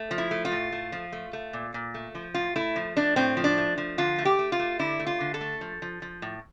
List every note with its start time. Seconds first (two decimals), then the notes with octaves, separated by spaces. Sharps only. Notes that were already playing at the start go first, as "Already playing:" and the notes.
Already playing: A3
0.11 F3
0.18 E4
0.31 A3
0.45 F4
0.52 A2
0.72 A3
0.92 F3
1.12 A3
1.33 A3
1.53 A#2
1.74 A#2
1.94 A3
2.15 F3
2.34 A2 F4
2.56 A3 E4
2.76 F3
2.96 A3 D4
3.16 A2 C4
3.37 F3
3.44 D4
3.58 A3
3.78 F3
3.98 D3 F4
4.18 A3
4.25 G4
4.39 A3
4.52 F4
4.59 A3
4.79 D3 E4
5.00 A3
5.07 F4
5.20 D3
5.34 A4
5.41 A3
5.61 F3
5.82 F3
6.02 F3
6.22 A2